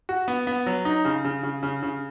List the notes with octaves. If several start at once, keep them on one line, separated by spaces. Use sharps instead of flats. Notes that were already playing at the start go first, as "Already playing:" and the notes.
F#4
B3
B3
F#3
D#4
C#3
C#3
C#3
C#3
C#3